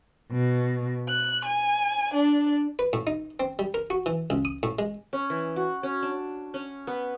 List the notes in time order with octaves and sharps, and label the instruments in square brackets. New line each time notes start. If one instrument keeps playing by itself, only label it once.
[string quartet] B2
F#6
G#5
D4
[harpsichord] B4
A2
D#4
C4
G3
A#4
F#4
E3
C#2
D#6
A2
G#3
[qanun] C#4
E3
F#4
C#4
D4
C#4
B3